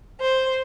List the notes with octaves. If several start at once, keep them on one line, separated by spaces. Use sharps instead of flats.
C5